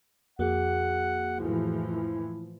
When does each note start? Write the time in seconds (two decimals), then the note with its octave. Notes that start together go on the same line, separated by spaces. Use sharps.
0.39 F2 A#3 F#4 G#4 F#5
1.41 A2 E3 F3 E4